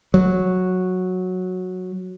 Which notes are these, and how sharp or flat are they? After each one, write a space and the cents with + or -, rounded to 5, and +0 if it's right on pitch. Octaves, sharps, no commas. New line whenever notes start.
F#3 -10